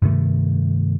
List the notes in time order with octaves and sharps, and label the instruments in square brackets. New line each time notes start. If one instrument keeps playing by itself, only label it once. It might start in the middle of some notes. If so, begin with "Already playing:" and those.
[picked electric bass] G2 C3 D#3 A3